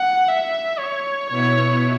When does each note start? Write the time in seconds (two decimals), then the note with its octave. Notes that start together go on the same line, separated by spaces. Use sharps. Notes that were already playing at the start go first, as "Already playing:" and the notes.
Already playing: F#5
0.28 E5
0.79 C#5
1.29 B2 B3 E4 C#5